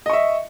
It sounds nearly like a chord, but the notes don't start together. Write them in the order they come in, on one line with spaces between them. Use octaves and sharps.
D#5 C#6 E5